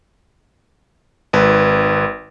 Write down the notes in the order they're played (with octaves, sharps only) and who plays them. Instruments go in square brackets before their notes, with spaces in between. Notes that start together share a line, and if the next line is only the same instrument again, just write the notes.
[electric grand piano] G#1 B4